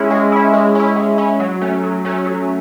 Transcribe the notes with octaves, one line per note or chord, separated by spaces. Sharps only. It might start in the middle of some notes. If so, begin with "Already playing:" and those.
Already playing: G#3 C#4 E4
G#3
C#4 E4
G#3
C#4 E4
G#3
C#4 E4
F#3
A3 C#4
F#3
A3 C#4
F#3